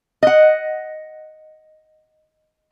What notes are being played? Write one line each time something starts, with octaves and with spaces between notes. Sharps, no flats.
D#5 F#5